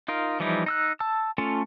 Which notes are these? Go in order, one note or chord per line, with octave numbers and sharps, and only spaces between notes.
D#4 F4 A#4
E3 F3 G3 D#4 E4
D#4 E6 F#6
A5 E6
A3 C#4 F4 A4